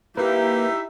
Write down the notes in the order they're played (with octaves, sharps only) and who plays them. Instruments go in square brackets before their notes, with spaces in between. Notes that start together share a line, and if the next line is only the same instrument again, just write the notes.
[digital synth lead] A#3 [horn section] D#4 E4 E5 [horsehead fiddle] G4 [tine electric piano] B4